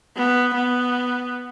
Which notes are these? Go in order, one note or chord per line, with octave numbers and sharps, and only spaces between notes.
B3
B3